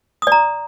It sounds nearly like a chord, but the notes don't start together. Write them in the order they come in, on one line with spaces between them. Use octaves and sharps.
D#6 D5 A#5